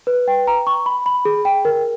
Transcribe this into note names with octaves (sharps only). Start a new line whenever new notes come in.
B4
G5
A#5
C#6
B5
B5
G#4
G5
A#4